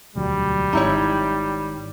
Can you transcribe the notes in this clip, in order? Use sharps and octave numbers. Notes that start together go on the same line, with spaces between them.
E1 D2 F#3 G3
G#1 G#2 D#4 E4 C#5